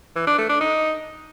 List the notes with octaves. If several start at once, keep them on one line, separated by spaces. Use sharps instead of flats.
E3
D4
A3
D4
D#4